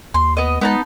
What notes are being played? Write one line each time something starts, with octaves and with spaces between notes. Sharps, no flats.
D#2 C6
B3 D#5
G#3 B3 D#4 A5